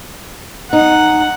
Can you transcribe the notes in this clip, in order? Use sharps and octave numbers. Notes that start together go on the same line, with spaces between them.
D#4 F#5